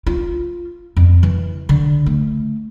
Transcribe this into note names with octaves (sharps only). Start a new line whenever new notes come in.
F4
F2
E3
D3
A3